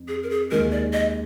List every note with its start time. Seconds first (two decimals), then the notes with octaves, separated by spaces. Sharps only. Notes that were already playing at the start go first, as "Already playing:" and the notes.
Already playing: F2
0.08 G#4
0.23 A#4
0.30 G#4
0.51 D#2 D#3 G#3 A#4
0.72 D5
0.93 D#5